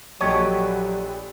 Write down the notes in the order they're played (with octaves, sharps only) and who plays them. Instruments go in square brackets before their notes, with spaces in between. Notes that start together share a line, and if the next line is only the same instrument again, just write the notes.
[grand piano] A#1 A4 D#5 [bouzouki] D3 G4 B4 [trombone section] F#3 [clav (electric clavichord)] C#5